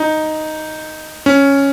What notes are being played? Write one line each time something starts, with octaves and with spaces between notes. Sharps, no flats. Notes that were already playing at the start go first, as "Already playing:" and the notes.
Already playing: D#4
C#4